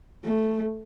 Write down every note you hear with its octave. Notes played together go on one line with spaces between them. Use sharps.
A3